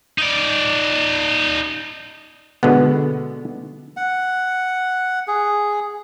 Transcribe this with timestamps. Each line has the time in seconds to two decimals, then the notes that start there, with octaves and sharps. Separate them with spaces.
0.18 D#4 D5
2.63 B2 D3 G#3 B3
3.97 F#5
5.27 G#4